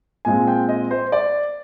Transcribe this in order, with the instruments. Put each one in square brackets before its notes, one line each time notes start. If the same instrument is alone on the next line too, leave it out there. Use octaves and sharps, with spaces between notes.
[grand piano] A#2 G#3 C4 G#5
G5
D#5
C5
D5